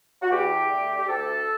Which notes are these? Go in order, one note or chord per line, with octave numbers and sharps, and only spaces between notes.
F#4
E2 G4
D3 A3
G4
D2 A4